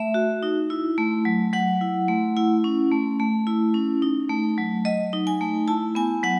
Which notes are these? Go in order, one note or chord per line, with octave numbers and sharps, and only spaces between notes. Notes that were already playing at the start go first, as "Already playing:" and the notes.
Already playing: A3 E5
F#4
D#4
E4
A3
F#3
F#3 F#5
E4
A3
E4
C#4
A3
A3
E4
C#4
D#4
A3
F#3
F#3 D#5
D#4
G#5
A3
E4 A5
B3 G#5
F#3 F#5